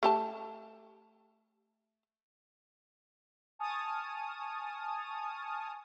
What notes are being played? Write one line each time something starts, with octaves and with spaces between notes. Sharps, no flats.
A3 G4 A5
G#5 A5 C#6 D#6 F6